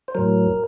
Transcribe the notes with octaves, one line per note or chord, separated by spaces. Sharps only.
C5
A2 F#3 A#4